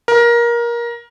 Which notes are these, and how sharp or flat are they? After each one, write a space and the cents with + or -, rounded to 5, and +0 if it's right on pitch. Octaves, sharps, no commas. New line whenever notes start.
A#4 +20